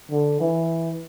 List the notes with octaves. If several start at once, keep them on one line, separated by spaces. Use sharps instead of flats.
D3
E3